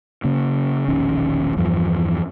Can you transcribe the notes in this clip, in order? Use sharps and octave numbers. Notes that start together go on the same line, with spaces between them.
C#3 A#3
E1 A#1 D#3 C#4
E2 G2 E3 F3